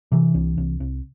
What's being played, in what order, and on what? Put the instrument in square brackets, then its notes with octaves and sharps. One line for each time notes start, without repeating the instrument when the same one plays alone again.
[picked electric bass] C3 E3
C2
C2
C2